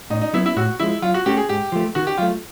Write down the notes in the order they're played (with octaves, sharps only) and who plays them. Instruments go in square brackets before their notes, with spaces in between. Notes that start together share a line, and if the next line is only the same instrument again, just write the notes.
[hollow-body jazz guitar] A2 [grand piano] D#4
[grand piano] D#4
[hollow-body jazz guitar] F#3 B3 [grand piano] E4
[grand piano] E4
[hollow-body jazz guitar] A2 [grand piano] F#4
[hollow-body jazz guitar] F3 G#3 [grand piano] E4
[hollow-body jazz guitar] F#3 [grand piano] F4
[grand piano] F#4
[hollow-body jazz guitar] A3 C#4 F#4 A4 [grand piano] G4
[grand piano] G#4
[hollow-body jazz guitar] G#2 [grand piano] G4
[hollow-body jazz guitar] F3 A3
[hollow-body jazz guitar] D#3 [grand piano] F#4
[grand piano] G4
[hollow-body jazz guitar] F#3 A3 [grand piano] F4